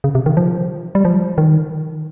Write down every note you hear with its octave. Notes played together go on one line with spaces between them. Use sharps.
C#3
C3
D#3
F3
G3
F3
D#3